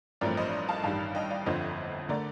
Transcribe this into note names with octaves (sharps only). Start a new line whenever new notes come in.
A1 G2 F3 A3 C4 A#4 D5
C5 D#5
F5 A5
A1 G2 D#3 G3 F5 A5
D#5 G5
D5 F5
G1 F2 D3 F3 C4 C5 D#5
D3 A3 A#4 D5